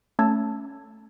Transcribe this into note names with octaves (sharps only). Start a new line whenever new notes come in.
A3 C#4 A5 E6 G#6